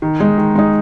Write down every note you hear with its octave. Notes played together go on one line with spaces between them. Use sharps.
D#3
G#3 D#4
D#3
G#3 D#4